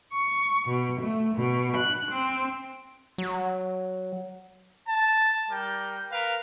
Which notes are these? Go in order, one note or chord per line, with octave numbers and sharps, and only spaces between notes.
C#6
B2
A3
B2
F#6
C4
F#3
A5
G3 A#4 G5
A#4 B4 F5